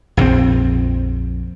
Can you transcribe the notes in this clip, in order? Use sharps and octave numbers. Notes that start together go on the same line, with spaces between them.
A#1 F2 D#3 C4